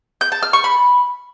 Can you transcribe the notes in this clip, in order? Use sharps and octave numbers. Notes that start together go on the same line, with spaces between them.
G6
A5
F6
C#6
B5